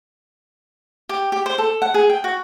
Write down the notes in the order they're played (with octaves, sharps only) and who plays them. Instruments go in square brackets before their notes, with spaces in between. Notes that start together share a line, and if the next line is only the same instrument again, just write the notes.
[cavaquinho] G4
G4
C5
A4
F#5
G#4
G5
F#4